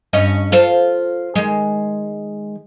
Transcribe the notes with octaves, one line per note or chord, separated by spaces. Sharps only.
G2 C#4 D#5
F4 A4 C5
D#3 G#3